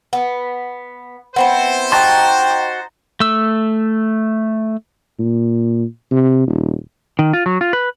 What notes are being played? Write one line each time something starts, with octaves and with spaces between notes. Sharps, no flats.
B3
B3 C4 E4 C5
D#4 F#4 G5 A5 C6
A3 E6
A#2
C3
D#1
D#3
F4
F#3
F4
B4